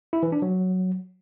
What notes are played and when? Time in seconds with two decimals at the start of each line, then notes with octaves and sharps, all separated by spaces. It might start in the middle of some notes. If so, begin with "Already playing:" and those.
0.13 E4
0.23 E3
0.32 D4
0.42 F#3